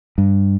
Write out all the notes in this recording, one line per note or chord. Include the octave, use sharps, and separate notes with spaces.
G2